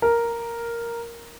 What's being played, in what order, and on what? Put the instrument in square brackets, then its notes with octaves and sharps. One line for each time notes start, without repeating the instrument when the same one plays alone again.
[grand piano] A#4